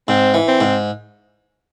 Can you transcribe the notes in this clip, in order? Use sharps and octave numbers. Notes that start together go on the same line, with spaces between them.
G#2 C4
E3
C4
G#2